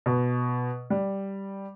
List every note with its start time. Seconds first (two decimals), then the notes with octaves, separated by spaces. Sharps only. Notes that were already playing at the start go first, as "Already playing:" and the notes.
0.06 B2
0.90 G3